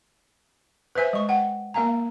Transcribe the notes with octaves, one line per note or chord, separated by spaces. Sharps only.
B4 C5 E5 G#5
G#3 C#6
F#5 G5
A#3 A#4 F5 G#5 A#5